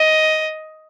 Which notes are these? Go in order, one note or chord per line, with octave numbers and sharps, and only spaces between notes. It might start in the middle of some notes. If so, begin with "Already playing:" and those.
Already playing: D#5